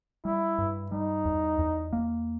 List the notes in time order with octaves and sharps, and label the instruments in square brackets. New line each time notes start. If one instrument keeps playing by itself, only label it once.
[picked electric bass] G3 [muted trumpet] E4
[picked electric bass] G2
[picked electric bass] G3 [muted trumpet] D#4
[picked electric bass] E2
E2
A#3